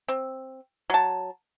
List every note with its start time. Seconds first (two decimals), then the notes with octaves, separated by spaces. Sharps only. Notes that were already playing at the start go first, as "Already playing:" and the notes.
0.08 C4
0.90 F#3 A5